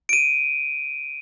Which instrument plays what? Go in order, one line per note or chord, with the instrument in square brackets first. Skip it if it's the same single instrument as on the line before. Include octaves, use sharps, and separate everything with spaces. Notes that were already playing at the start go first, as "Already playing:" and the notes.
[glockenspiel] D7 D#7